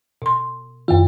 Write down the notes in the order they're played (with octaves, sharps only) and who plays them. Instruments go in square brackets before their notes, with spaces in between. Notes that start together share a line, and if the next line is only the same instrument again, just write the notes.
[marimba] B2 C6
[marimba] F#2 D#3 [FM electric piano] F4